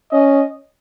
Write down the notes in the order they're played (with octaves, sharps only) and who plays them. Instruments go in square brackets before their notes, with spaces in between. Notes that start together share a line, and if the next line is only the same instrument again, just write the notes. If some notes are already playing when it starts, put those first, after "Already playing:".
[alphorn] C#4 [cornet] D#5